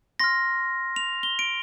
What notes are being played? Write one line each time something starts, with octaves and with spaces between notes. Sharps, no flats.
C6 F6 A#6
F7
G7
D7